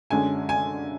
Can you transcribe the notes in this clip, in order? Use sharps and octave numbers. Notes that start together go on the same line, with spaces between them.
F#2 D3 G#3 C#4 G#5
G#5